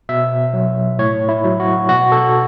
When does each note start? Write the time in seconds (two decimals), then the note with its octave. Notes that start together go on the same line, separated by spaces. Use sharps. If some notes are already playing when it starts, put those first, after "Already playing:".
0.09 B2 E5
0.54 F#3
0.99 A2 C#5
1.29 E4
1.44 F#3
1.60 F#4
1.89 B2 F#4
2.12 A4